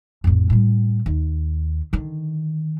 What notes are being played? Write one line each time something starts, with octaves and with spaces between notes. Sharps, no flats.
A1 F2
A2 G3
D#2
D3 D#3